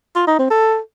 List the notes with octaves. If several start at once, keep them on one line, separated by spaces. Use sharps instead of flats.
F4
D#4
C4
A4